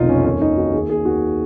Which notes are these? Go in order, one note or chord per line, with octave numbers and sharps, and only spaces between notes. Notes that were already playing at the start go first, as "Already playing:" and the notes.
Already playing: F1 B1 D#3 D#4 F4
F2 C#4
D#2 C#4
D#2 D#4
D#2 F#4
D#2 G#4
D#2 G#4
D#2 F#4